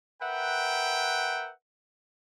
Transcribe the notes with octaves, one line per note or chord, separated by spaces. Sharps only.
A#4 B4 E5 F#5 G5